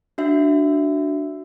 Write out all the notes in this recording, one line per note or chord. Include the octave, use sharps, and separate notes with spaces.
D4 F#4 E5